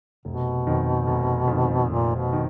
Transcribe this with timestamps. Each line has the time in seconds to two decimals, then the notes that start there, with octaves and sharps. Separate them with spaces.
0.25 F1 B2
0.67 F2 D#3
1.07 F1
1.47 F2 D#3
1.89 F1 A#2
2.15 B2
2.33 D#3